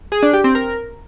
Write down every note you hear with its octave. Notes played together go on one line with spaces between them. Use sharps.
G#4
D4
G4
C4
A#4